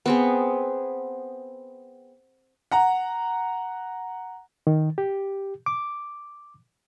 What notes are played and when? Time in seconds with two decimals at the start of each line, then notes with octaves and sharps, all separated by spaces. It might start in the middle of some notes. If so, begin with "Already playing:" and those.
0.06 B3 C4 G#4
2.71 F#5 A#5
4.67 D#3
4.98 G4
5.66 D6